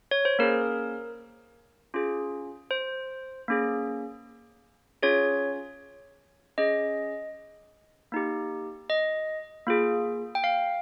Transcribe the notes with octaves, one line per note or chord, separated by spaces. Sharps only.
C#5
C5
A#3 C#4 G#4 A#4
C#4 F4 G#4
C5
A#3 C#4 G#4
C#4 F4 G#4 C#5
C#4 G#4 D#5
A#3 D#4 G4
D#5
A#3 F4 G#4
G5
F5